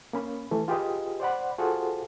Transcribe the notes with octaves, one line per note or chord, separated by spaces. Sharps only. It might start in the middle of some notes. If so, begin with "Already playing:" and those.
A#3 C#4 B5
E3 A3
F4 G4 G#4 B4 D#5
C5 D5 F#5 B5
F4 F#4 G#4 A4 C5